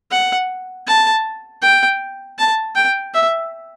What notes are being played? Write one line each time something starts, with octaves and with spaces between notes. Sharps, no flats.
F#5
A5
G5
A5
G5
E5